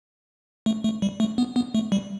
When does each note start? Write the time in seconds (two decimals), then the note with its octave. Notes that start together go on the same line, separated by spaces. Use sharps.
0.66 A3
0.84 A3
1.02 G3
1.20 A3
1.38 B3
1.56 B3
1.75 A3
1.92 G3